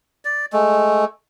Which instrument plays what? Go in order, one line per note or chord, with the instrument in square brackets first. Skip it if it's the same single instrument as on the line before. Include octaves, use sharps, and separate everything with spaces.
[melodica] D5
G#3 A3